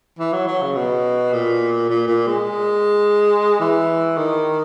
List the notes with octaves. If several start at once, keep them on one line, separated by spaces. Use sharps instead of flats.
E3
F#3
F#3
C#3
B2
A#2
A#2
A#2
G#3
E3
D#3